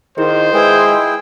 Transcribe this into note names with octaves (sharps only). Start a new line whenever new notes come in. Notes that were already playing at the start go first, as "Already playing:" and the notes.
D#3 E4 F4 G#4 C5
G#3 E4 G#4 B4 G5